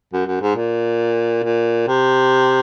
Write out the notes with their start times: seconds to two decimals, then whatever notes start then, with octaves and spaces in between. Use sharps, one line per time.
0.13 F#2
0.26 F#2
0.41 G#2
0.55 A#2
1.43 A#2
1.88 C3